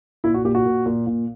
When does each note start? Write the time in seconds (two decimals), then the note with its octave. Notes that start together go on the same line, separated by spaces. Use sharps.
0.24 A#2 E4
0.34 F#4
0.45 A#2 G4
0.55 F#4
0.66 A#2
0.86 A#2
1.07 A#2